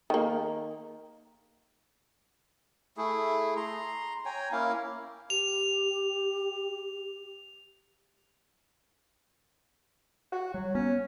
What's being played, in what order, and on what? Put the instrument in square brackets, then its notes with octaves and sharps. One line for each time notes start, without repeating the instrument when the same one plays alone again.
[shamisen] D#3 A#3
[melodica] A3 E4 G#4
A#5 C6
C#5 G5 G#5 A#5
A#3 C#4 E4 F5
[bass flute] G4 [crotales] F7
[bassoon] F#4
[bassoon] F#3 [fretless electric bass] G3
[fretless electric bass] B3 [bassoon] C#4